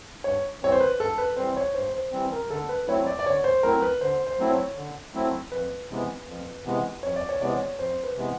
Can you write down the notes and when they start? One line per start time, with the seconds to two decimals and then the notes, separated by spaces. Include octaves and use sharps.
0.24 G2 C#5
0.61 E3 G3 C4 C#5
0.72 C5
0.80 B4
0.99 G2 A4
1.18 B4
1.37 E3 G3 C4 C5
1.57 C#5
1.74 G2 C5
1.94 C5
2.12 E3 G3 C4
2.32 A#4
2.50 D3 A4
2.69 B4
2.87 F#3 A3 C4 E4 C#5
3.07 D5
3.19 D5
3.26 D3 C#5
3.44 C5
3.63 F#3 A3 C4 E4 A#4
3.82 B4
4.01 D3 C5
4.27 C5
4.38 F#3 A3 C4 E4
4.51 C#5
4.76 D3
5.14 F#3 A3 C4 E4
5.51 F2 B4
5.90 C3 E3 G#3 B3
6.27 F2
6.65 C3 E3 G#3 B3
7.03 F2 C#5
7.16 D5
7.29 C#5
7.40 C3 E3 G#3 B3 D5
7.55 C#5
7.78 F2 C5
8.04 B4
8.16 C3 E3 G#3 B3